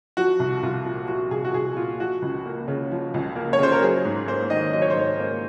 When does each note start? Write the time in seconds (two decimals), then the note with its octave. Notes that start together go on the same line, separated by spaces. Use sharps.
0.17 F3 F#4
0.40 C2
0.63 C2 F4
0.86 A#2
1.08 F3 F#4
1.31 C2 G#4
1.45 F#4
1.54 C2 G#4
1.77 A#2 F4
2.00 F3 F#4
2.22 C#2
2.46 A#3
2.68 C#3
2.91 F3
3.14 C#2
3.36 A#3
3.53 C#5
3.59 C#3 C5
3.72 A#4
3.82 F#3 G#4
4.05 G#2
4.28 A#3 C5
4.50 D#3 D#5
4.73 F#3 D#5
4.82 C#5
4.90 C5
4.95 G#2 C#5
5.19 A#3